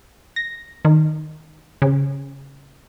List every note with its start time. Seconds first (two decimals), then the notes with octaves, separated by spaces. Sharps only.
0.36 A#6
0.85 D#3
1.82 C#3